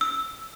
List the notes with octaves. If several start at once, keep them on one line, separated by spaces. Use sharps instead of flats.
E6